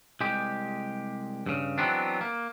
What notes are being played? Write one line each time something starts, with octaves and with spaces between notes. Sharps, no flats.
C2 G#3 G4
G2 C#3
E3 F#3 B3 C4 D4
A#3